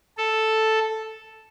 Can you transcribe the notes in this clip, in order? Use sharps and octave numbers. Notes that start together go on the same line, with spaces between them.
A4